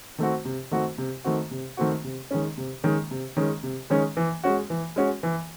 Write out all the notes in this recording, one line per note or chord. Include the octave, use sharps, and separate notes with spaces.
D#3 A3 C4 F#4
C3
D#3 A3 C4 F#4
C3
D#3 A3 C4 F#4
C3
D#3 A3 C4 F#4
C3
D#3 G#3 C#4
C3
D#3 G#3 C#4
C3
D#3 G#3 C#4
C3
D#3 G#3 C#4
E3
G#3 C#4 F#4
E3
G#3 C#4 F#4
E3